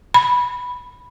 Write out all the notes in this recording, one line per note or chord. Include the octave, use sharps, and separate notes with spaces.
B5